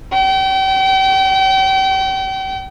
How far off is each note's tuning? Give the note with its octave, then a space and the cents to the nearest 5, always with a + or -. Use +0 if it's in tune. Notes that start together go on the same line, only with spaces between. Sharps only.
G5 -35